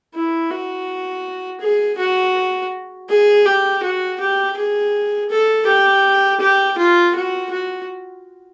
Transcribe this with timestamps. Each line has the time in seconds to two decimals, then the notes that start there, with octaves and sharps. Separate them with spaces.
0.15 E4
0.50 F#4
1.61 G#4
1.98 F#4
3.09 G#4
3.45 G4
3.83 F#4
4.20 G4
4.57 G#4
5.30 A4
5.66 G4
6.40 G4
6.78 F4
7.15 F#4
7.51 F#4